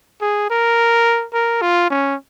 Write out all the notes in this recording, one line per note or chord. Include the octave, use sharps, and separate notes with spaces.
G#4
A#4
A#4
F4
C#4